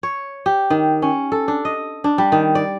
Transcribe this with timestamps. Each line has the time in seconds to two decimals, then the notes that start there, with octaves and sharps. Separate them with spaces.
0.03 C#5
0.46 G4
0.70 D#3
1.02 C#4
1.32 A4
1.48 D4
1.65 D#5
2.04 D4
2.18 G3
2.32 D#3
2.55 D5